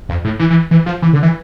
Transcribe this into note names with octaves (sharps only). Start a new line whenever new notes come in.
F2
A2
E3
E3
E3
F3
E3
D3
E3